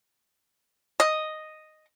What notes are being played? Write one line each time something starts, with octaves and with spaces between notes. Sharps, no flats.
D#5